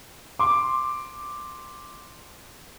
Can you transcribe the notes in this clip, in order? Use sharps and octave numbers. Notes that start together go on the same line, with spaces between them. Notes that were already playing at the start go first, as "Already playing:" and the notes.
C6 D6